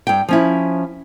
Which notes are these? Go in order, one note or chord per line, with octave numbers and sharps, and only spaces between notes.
G2 G5
F3 C#4 E4